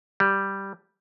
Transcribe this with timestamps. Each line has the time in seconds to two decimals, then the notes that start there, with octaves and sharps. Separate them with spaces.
0.20 G3